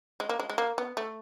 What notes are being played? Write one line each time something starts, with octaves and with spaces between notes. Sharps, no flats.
G#3
A#3
G#3
G#3
A#3
B3
A3